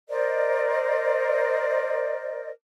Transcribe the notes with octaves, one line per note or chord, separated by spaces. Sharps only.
A#4 C5 D5 D#5